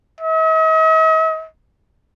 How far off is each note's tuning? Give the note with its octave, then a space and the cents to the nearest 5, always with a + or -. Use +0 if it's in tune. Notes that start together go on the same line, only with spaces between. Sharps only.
D#5 +45